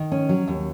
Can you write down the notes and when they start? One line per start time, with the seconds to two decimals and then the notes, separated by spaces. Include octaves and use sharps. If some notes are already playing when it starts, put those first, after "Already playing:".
Already playing: D#3
0.12 C#4
0.29 F#3
0.48 D#2